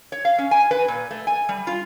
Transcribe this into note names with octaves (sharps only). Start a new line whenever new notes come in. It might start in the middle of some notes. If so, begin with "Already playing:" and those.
C#5
F5
C#4
G#5
B4
A#2
A3
G#5
G3
F4